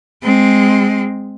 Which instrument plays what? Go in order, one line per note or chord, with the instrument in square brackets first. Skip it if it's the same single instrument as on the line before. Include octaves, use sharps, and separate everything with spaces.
[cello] G#3 C4